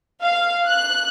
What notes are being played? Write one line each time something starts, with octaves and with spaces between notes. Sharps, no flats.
F5
F#6